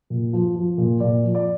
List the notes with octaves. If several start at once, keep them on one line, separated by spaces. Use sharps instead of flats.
A#2
F3
F3
A#2
A#2 D5
F3
D5